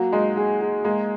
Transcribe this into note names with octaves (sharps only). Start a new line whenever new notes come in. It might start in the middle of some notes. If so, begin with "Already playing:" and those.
Already playing: F#3 A#3 F#4
G#3 D#4
G#4
G#4
G#3 A#3